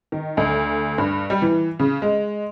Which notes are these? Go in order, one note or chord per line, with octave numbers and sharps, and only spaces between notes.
D#3
D2
G2
G3
E3
C#3
G#3